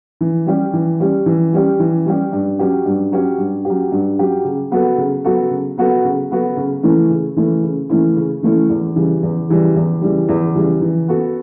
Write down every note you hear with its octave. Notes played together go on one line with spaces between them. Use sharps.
E3
G3 C#4 G4
E3
G3 C#4 G4
E3
G3 C#4 G4
E3
G3 C#4 G4
G2
F#3 C#4 G4
G2
F#3 C#4 G4
G2
F#3 C#4 G4
G2
F#3 C#4 G4
C#3
F#3 B3 F#4 A4
C#3
F#3 B3 F#4 A4
C#3
F#3 B3 F#4 A4
C#3
F#3 B3 F#4 A4
C#3
E3 A3 C#4 E4
C#3
E3 A3 C#4 E4
C#3
E3 A3 C#4 E4
C#3
E3 A3 C#4 E4
E2
C#3 E3 G3
E2
C#3 E3 G3
E2
C#3 E3 G3
E2
C#3 E3 G3
E3
B3 F#4 A4